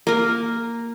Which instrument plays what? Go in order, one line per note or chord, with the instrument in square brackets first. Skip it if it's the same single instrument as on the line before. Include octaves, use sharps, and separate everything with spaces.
[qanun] A#3 A#4